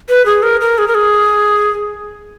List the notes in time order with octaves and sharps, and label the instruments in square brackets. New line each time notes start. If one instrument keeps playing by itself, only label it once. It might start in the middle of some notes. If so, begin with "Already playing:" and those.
[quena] B4
G#4
A#4
A#4
G#4
A#4
G#4